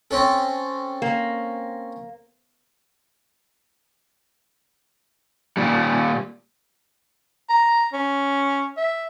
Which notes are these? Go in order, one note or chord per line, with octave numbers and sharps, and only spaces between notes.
C4 C#4 A4
A#3
A#2 G3
A#5
C#4
E5